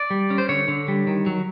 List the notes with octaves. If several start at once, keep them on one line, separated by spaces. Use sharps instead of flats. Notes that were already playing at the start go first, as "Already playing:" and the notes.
Already playing: D5
G3
C#4
C5
D3 C#5
D3
G3
D#3
F#3